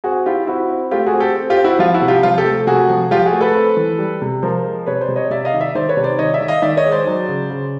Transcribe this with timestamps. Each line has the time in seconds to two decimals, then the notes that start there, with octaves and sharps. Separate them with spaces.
0.04 C4 F#4 G#4
0.26 E4 F4 G4
0.47 C4 E4 F#4
0.70 C4
0.91 A3 F4 G4
1.06 F#4 G#4
1.14 C4
1.20 G4 A4
1.36 C4
1.50 F4 G4
1.57 C4
1.64 E4 F#4
1.79 F3 F4
1.94 E4 F#4
2.02 C3
2.08 F4 G4
2.23 F3 F4
2.38 G4 A4
2.45 A3
2.67 C3 F#4 G#4
2.89 F3
3.11 F3 F4 G4
3.25 F#4 G#4
3.33 A3
3.41 A4 B4
3.55 C4
3.77 E3
3.99 G3
4.22 C3
4.43 F3 A#4 C5
4.64 G#3
4.86 C3 B4 C#5
5.01 C5 D5
5.08 C3
5.16 C#5 D#5
5.30 C3 D5 E5
5.45 D#5 F5
5.53 D#3
5.60 D5 E5
5.75 D#3 C5 D5
5.89 B4 C#5
5.97 C3
6.04 C5 D5
6.19 D#3 C#5 D#5
6.34 D5 E5
6.41 D#3
6.48 D#5 F5
6.62 D#3 D5 E5
6.77 C#5 D#5
6.85 G#3
6.91 C5 D5
7.07 F#3
7.28 C#3
7.50 C#3